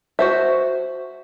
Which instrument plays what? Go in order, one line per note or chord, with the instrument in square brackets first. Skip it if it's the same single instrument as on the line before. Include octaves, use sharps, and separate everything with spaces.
[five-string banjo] F#4 C5 E5